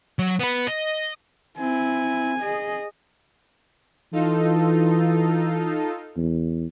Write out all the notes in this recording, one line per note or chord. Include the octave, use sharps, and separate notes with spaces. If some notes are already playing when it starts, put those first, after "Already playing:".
F#3
B3 B4
D#5
C4 E4 G#5
G#4 D#5
E3 D#4 F4 A4
E2